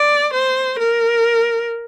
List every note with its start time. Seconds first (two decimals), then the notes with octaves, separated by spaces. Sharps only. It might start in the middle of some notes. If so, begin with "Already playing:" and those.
Already playing: D5
0.33 C5
0.79 A#4